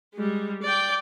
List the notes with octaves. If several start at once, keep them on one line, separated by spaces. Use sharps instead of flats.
G3 G#3
D5 G5